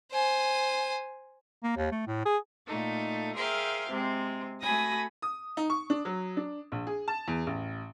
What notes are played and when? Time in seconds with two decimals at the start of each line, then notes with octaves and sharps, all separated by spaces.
0.12 C5 G#5
1.64 A#3
1.77 D#2
1.91 A3
2.07 A2
2.26 G#4
2.67 A#2 A3 D#4 A4
3.35 G#4 A#4 C5 E5 F5 G5
3.89 C3 G#3 C4
4.61 A3 F#4 G#5 B5 D#6 A#6
5.22 D#6
5.57 D#4
5.70 C#6
5.90 D4
6.05 F#3
6.37 D4
6.72 A#1
6.87 G#4
7.08 A5
7.28 E2
7.47 A1